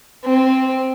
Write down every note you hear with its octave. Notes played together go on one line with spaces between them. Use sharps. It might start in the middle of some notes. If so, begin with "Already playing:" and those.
C4